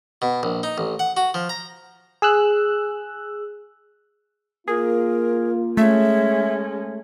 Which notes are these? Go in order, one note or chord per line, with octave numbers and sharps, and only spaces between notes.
B2
A#1
D#4
A1
F#5
F#4
F3
A#5
G#4 E6 F#6
A#3 F4 G#4 A#4
G#3 A3 C#4 E5